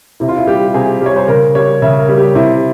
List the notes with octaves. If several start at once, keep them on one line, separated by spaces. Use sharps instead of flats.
C3 E4
F4
E4
G3 G4
C3 G#4
G3 C#5
C5
C#3 A#4
G3 C#5
C#3 E5
A#4
G3
G4
C3 E4